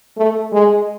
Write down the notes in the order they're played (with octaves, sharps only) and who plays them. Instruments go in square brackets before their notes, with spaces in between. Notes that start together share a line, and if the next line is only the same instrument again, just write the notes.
[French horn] A3
G#3